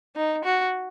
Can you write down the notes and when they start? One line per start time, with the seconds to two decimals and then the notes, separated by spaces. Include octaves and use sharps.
0.16 D#4
0.44 F#4